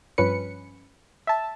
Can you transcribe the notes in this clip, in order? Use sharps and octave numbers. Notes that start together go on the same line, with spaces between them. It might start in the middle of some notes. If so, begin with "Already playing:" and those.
G2 F3 C#4 B4 C#7
E5 A5